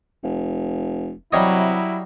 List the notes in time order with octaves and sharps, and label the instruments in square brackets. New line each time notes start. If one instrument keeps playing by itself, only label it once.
[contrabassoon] F1
[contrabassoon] C3 [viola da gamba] F#3 [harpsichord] G3 C#5 D#5 [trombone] E4